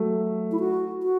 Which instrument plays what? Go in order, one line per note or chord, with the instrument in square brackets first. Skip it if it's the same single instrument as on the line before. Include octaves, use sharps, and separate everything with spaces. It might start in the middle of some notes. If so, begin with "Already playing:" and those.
Already playing: [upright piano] F#3 A3
[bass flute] E4
F#4
F#4